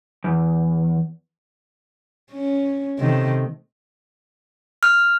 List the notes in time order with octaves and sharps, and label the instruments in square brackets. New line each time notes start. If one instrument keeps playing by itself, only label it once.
[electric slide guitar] E2
[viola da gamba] C#4
C3 D#3 A3
[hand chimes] F6